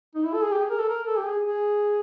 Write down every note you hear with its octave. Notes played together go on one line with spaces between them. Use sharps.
D#4
E4
A4
G#4
G4
G#4
A#4
A4
A#4
A4
G4
G#4
G#4